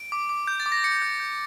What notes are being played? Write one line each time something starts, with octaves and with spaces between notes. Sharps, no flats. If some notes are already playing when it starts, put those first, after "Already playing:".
Already playing: D7
D6
D6
G6
A6
D6
A#6
D6 C#7
G6
G6